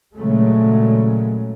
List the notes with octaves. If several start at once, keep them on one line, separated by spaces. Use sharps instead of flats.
A#2 C#3 F#3 G#3 A3